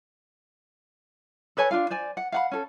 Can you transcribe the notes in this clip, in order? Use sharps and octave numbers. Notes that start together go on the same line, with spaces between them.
A4 B4 C#5 G#5
D4 F4 F5
C5 D5 G#5
F#5
F5 F#5 B5
C#4 A4